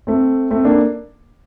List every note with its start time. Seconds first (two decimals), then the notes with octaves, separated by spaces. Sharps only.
0.07 A3 C4
0.51 A3 C4
0.65 A#3 D4